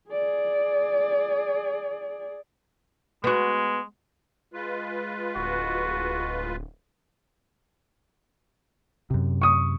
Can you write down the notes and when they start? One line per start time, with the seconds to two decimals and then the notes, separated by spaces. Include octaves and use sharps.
0.10 G#4 D5
3.24 G#3 B3 F#4
4.54 G#3 F4 B4
5.36 D1 F#4
9.10 F#2 C3
9.42 C#6 D#6